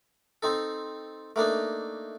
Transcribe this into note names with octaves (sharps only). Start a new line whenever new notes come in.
C4 D#4 A4
A3 A#3 D4 D#4